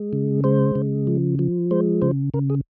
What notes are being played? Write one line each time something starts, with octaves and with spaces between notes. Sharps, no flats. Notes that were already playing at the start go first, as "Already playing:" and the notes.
Already playing: G#3
C#3
G#3 C5
C#3
F3
F3
G#3 C5
C#3 C5
C#3 A#4
G#4